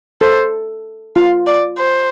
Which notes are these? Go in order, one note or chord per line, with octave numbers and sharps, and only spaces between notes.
A4 C5
F4 F5
D5
C5